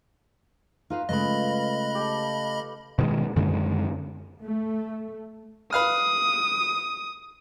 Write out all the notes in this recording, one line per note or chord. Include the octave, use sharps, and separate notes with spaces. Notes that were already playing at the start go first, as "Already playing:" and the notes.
D#4 F4 B4 F5
C#3 G#3 A3 B4 D#5 B5
G4 A4
B2 D#3 G#3
F#2 D3 D#3 G#3
A3
B4 F5 D#6 F6